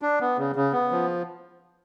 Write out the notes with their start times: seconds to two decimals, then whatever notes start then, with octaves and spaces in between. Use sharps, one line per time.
0.02 D4
0.20 B3
0.38 C#3
0.56 C#3
0.72 B3
0.91 F3